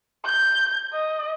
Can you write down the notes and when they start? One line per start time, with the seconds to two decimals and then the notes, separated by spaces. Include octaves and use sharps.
0.25 G6
0.93 D#5